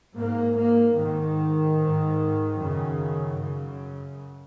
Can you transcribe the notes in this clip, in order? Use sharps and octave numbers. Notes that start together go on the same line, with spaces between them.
G#2 A#3
A#3
G#2 D#3
G#2
F#2 C#3
F#2 C#3